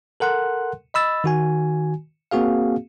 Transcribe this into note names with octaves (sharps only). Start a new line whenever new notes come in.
A4 A#4 F#5 C6 F#6
D#5 B5 E6 A6
D#3 F#4 G#5
A#3 C4 F#4 G#4 F5